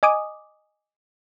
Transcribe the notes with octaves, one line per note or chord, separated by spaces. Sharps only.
D#5 G#5 D6 D#6